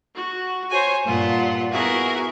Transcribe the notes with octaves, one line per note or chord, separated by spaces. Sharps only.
F#4
C5 C#5 G#5
G2 A#2 F4 F#5
B3 E4 F#4 G#4 A#4